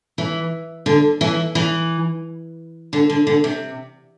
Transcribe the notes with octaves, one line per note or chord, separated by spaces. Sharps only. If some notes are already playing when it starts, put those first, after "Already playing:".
E3
D3
E3
E3
D3
D3
D3
C3